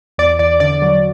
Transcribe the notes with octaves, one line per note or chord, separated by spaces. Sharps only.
E2 D5
E2 D5
D3 D5
F#3